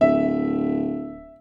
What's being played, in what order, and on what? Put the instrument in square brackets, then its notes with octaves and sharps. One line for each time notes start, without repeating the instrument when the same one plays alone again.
[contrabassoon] D1 [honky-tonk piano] E5